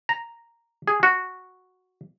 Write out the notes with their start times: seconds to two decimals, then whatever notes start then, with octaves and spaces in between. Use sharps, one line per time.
0.09 A#5
0.88 G#4
1.03 F#4